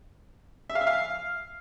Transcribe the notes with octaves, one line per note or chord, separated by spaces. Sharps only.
E5
F5
E5
F5